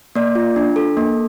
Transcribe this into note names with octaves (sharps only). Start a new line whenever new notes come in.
A#3 D5
F4
D4
A4
A#3